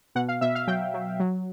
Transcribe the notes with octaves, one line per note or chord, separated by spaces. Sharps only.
B2 F#5
F5
B2 E5
F5
F#3 G5
F#3
F#3